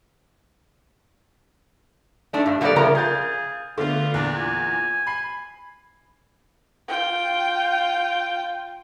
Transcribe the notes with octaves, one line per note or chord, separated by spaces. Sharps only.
A3 D4 D#4
G2
F#3 G3 A#3 F4 A4 D5
C#3 F3 A3 A#4 A#5
G#4 F5 G6 A6
D3 A3 B3 F4
E2 A#2 D4
G#5
B5 C7
F4 G5